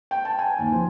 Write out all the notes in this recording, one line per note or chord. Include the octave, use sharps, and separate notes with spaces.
G5
A5
G#5
D#2
F3